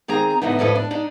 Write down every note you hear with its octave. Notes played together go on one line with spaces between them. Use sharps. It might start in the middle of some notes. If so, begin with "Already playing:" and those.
D#3 C4 G#4 A#5
A2 D3 E3 F#3 B3 D#4
F2 A2 A4 B4 D5 D#5
D4
D4 D#4